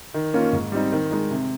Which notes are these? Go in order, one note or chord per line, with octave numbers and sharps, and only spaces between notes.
D#3
A#3 C#4 F4
G#2
G3 C4 D#4
D#3
G#3 D#4
C3